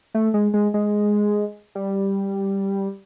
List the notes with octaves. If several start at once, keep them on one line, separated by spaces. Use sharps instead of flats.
A3
G#3
G#3
G#3
G3